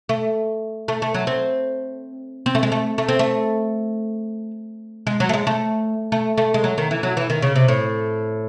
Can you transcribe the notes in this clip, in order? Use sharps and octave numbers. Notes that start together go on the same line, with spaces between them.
A3
A3
A3
F#3
C4
C4
A3
G#3
A3
A3
C4
A3
G#3
F#3
A3
G#3
A3
A3
A3
G#3
F#3
D#3
E3
F#3
E3
D#3
C#3
C3
A2